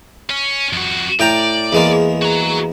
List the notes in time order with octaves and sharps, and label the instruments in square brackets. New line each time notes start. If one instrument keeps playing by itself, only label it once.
[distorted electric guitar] C#4
F2 F#4
[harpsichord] A2 G5 A#5 [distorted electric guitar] D5
[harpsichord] E2 G#3 A#3
[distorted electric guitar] F#4 A#5